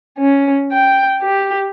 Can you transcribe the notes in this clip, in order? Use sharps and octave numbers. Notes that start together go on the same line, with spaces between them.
C#4
G5
G4